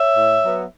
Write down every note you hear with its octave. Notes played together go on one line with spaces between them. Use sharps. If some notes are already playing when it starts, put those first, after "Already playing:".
Already playing: C#5 E5
A2
F#3 B3